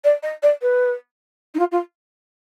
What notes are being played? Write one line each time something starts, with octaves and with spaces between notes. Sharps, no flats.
D5
D#5
D5
B4
D#4
F4
F4